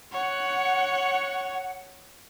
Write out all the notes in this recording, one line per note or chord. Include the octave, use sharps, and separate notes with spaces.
C#5 F#5